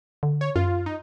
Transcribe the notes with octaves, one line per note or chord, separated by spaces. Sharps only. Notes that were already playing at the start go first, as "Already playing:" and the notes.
D3
C#5
F#2 F4
D#4